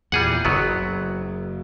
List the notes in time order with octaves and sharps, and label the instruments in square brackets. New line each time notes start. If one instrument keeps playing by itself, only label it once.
[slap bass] E2 A#2 [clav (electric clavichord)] G3 G#4 F#5
[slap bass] F#1 [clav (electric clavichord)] F#3 B3